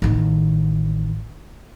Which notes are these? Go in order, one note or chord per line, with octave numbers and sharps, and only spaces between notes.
A1 D#3